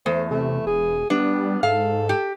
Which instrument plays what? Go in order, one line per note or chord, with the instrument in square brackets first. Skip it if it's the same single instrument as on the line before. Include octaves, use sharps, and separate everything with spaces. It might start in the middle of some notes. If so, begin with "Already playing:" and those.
[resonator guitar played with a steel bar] E2 [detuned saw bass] A3 [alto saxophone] C5
[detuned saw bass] C3 [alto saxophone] A3
[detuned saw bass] E1 [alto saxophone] G#4
[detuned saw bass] G3 [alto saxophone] B3 [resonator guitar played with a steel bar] D4
[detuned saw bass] G#2 [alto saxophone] A4 [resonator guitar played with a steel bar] F5
[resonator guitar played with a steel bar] G4